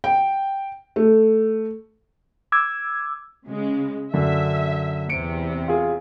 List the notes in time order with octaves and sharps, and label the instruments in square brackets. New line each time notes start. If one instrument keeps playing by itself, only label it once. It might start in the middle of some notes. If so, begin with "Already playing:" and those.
[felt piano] G5
A3
[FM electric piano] D6 E6 G#6
[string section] C#3 G#3
[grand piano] F#2 D3 [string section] E5
[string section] E2 C3 [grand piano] C#7 D7
[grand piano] F4 G#4